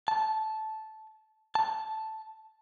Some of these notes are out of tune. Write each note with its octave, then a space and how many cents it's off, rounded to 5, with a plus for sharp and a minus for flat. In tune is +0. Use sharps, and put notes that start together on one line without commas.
A5 -10
A5 +0